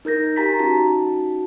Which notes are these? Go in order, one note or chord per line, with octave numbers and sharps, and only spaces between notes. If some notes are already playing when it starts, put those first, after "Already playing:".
D#4 A#4 G6 A#6
G4 G#5 A#5 A6 B6
C#4 D#4 F#4 A5